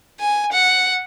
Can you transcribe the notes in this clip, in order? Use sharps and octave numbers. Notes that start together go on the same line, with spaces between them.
G#5
F#5